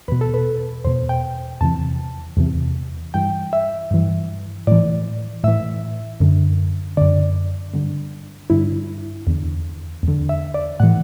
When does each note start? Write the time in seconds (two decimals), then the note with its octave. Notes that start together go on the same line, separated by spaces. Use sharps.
0.08 E2 B2 B4
0.21 A4
0.34 B4
0.84 E2 B2 C5
1.09 G5
1.61 E2 C3 E3 A5
2.37 E2 C3 E3
3.14 G2 E3 G5
3.53 E5
3.91 G2 E3
4.67 A2 E3 D5
5.44 A2 E3 E5
6.20 F#2 D3
6.97 F#2 D3 D5
7.74 G2 D3
8.50 G2 D3 E4
9.27 E2 D3
10.03 E2 D3
10.29 E5
10.54 D5
10.80 A2 E3 F#5